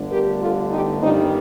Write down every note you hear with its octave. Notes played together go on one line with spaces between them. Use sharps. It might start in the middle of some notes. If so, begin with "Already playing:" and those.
Already playing: G1 G2 D3 A3
G4 A#4
F4 A4
D#4 G4
G1 G2 D#3 G3 C4 D#4